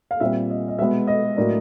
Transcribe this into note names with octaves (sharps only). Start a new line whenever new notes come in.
F5
A#2 G3 C4 E5
D#5
D#5
B2 G#3 B3 E5
D#5
A2 F#3 A#3 D4